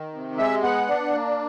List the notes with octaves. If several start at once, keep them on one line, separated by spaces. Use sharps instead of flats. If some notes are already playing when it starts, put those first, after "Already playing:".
Already playing: D#3
C3
G#3 E5
B3 F#5
D4
A#3